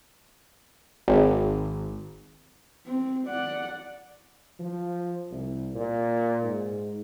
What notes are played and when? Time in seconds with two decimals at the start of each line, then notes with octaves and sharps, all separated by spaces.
1.08 G#1
2.86 C4
3.28 D5 F#5
4.59 F3
5.31 C2
5.74 A#2
6.42 G#2